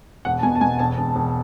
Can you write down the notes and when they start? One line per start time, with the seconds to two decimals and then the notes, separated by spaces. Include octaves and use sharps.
0.25 E1 F#5
0.39 A5
0.43 B2 G#5
0.55 A5
0.61 B2 G#5
0.79 E1 A5
0.97 E1
1.15 E1